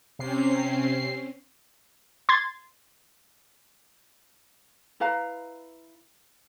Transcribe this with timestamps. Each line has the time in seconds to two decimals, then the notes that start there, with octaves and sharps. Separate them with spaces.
0.19 C3 C4 C#4 C7
2.29 C6 G#6 A6
5.00 E4 B4 F5 A#5